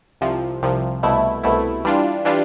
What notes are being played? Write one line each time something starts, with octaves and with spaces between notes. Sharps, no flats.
C2 C3 F3
C2 C3 F3
C2 B2 A3 E4
C2 B2 A3 E4
E3 G3 D4 F4
E3 G3 D4 F4